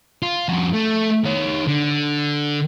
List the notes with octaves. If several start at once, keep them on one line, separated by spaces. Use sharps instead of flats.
F4
F2 F#4
A3
D#3 C#5
D3